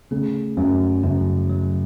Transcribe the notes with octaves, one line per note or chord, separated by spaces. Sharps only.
C#3 A3
F#2 F#3
F#2 C#3
F#3